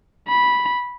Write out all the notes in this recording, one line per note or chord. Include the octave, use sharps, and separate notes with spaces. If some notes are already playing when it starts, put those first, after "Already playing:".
B5